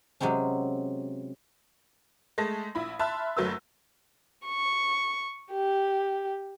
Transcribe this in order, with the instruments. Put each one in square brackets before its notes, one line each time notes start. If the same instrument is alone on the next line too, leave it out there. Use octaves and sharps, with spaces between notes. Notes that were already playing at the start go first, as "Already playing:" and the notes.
[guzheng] C3 F#3 G#3 C4 C#4
[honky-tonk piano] G#3 A3 A5 A#6
A#1 E4 B5
E5 A5 B5 C6 F6 F#6
F#1 F#3 A3 B4 E6
[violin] C#6
G4